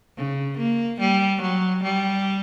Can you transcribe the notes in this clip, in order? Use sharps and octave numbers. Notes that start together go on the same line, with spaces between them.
C#3
A#3
G3
F#3
G3